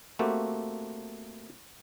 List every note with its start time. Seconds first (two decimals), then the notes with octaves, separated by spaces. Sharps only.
0.19 A3 A#3 C4 F#4 G4 A4